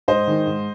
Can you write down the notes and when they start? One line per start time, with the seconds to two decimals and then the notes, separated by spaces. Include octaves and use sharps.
0.08 G#2 C5 D#5
0.27 D#3 G#3 D#4
0.46 G#2